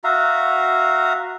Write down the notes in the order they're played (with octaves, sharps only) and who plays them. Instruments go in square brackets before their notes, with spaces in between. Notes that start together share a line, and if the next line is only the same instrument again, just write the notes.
[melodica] F#4 E5 F5 A#5